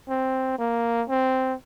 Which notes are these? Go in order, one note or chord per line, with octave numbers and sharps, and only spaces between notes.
C4
A#3
C4